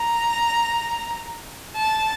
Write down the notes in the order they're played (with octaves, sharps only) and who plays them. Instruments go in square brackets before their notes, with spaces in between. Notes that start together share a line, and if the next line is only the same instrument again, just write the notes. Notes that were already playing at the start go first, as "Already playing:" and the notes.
Already playing: [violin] A#5
A5